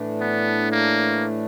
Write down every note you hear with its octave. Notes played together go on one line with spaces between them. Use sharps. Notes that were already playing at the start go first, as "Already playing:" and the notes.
Already playing: A2 E3 A3 D4
B3
A#3